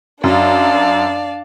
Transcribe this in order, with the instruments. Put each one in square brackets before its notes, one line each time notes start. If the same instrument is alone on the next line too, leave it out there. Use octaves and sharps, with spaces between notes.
[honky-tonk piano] F#2 [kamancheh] D4 A5 [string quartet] D5 F5